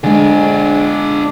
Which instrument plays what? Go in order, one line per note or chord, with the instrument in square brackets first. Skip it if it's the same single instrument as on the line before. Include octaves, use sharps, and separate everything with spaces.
[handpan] D3 G#3 [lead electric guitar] D4 G#4